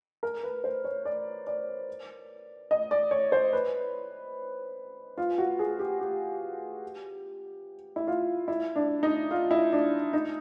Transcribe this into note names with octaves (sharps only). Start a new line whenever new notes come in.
A#4
B4
C5
C#5
D5
D5
D#5
D5
C#5
C5
B4
F4
F#4
G#4
G4
G4
E4
F4
E4
D4
D#4
F4
E4
D4
D#4